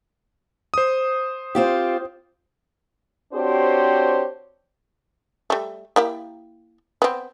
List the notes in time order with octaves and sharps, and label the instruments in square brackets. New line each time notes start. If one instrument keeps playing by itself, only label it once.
[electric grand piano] C5 D#6
[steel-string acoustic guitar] C4 F4 G4
[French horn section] C4 D4 F#4 G4 C5 C#5
[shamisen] G3 A3
A#3 E4 G4
B3 C4